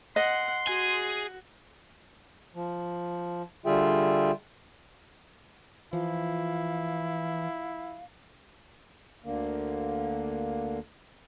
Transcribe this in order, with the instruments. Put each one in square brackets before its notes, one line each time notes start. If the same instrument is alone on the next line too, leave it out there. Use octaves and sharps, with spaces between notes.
[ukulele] D#5 [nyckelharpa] F#5 [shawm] C6
[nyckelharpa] F#4 [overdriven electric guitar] G#4 G#5
[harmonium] F3
D3 G3 F4 G#4 E5 G5
[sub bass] E3 [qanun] F3 [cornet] E4 [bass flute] F5
[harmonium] D2 D3 A#3